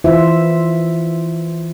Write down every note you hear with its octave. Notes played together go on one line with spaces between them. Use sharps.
E3 E4 F4 C5 E5